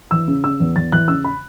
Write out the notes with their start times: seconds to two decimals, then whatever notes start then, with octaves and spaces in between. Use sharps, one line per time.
0.11 E3 E6
0.28 C#3
0.44 C#3 E6
0.60 E2
0.76 E2 A6
0.92 E3 F#6
1.08 C#3 E6
1.24 B5